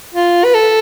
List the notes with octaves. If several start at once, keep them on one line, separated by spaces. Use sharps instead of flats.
F4
B4
A4